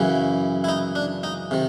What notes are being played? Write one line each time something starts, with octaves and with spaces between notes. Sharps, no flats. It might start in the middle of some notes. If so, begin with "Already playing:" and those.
Already playing: F#2 C#3 E3
E4
D#4
D4
D#4
C3 D#3